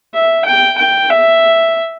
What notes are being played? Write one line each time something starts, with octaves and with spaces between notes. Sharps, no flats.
E5
G5
G5
E5